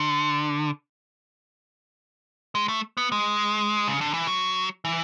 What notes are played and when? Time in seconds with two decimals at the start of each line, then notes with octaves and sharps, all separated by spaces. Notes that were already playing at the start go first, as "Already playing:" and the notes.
Already playing: D3
2.55 G#3
2.69 A3
2.97 B3
3.12 G#3
3.88 C#3
4.01 D3
4.14 E3
4.27 F#3
4.85 E3